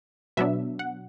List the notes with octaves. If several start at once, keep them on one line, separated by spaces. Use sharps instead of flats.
B2 F#3 B3 D4 E5
F#5